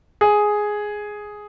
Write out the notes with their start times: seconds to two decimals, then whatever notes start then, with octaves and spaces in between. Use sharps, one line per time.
0.21 G#4